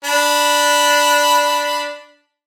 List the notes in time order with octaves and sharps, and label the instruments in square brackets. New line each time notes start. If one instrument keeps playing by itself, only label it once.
[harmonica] D4 B5